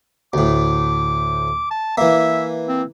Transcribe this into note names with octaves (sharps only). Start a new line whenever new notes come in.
D2 A2 D6
A5
E3 A#3 E5
C4